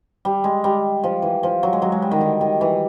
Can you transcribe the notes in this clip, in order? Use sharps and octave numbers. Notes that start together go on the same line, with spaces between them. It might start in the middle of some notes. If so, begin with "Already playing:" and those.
G3
G#3
G3
F3
E3
F3
F#3
G#3
F#3
G#3
G3
D#3
D3
D#3
E3